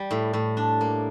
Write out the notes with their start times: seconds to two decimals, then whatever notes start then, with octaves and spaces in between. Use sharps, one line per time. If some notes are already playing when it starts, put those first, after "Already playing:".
Already playing: G3
0.11 A2
0.33 A2
0.57 D4
0.81 A#3